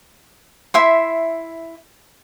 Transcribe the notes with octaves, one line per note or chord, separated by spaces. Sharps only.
E4 E5 C6